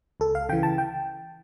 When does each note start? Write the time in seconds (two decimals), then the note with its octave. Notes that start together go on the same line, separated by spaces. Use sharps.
0.20 C#2 A4
0.35 F5
0.49 C#3 E3 G5
0.63 A5
0.78 G5